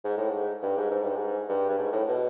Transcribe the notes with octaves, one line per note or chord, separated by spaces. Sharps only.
G#2
A2
G#2
G2
G#2
G#2
G2
G#2
G2
G2
G#2
A2
B2